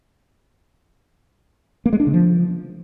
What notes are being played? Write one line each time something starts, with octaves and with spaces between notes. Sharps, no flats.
A#3
G#3
D4
C#3
F3